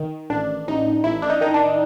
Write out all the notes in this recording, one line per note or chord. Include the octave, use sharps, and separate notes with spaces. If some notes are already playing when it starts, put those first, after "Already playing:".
Already playing: D#3
A1 D4
A1 D#4
A1 E4
D4
D#4
D#3 D#4
D4